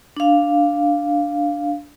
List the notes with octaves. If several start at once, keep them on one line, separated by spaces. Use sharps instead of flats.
D4 F5